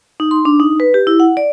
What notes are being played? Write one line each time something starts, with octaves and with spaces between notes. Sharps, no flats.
D#4
C6
D4
D#4
B4
G4
E4
F#5
D5